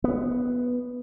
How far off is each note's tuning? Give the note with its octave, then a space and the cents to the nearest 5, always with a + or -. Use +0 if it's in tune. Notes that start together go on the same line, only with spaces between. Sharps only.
B3 -5